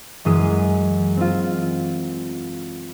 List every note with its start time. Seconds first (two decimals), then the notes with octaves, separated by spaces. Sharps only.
0.25 F#2 E3 G#3 D#6
1.17 C4 F4